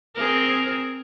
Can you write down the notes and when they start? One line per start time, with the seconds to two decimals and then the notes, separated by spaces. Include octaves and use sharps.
0.16 C4 G#4 A#4